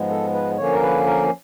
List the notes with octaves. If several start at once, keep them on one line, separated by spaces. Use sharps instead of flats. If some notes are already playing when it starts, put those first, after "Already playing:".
Already playing: G#2 F3 G#3 B3
A4
B4
D3 F3 A#3 C#4 C#5
A#4
B4
A#4